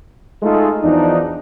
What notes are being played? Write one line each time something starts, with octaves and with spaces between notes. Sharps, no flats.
G#3 A3 D#4 F4 G#4 A4
E2 F3 D4 D#4